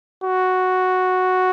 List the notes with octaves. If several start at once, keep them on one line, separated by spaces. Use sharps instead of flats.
F#4